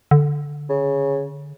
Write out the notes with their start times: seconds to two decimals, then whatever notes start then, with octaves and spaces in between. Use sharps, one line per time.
0.11 D3
0.69 C#3